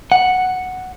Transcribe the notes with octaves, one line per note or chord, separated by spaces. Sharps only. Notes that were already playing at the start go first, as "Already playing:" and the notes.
F#5